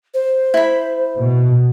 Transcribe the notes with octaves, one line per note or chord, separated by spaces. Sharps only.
C5
E4 B5
B2